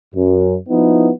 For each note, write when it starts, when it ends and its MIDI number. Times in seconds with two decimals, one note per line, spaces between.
0.15 0.57 42
0.69 1.11 53
0.69 1.11 59
0.69 1.11 63
0.69 1.11 64